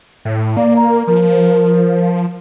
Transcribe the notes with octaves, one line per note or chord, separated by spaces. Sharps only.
A2
A#3 D5
A#5
F3 A#4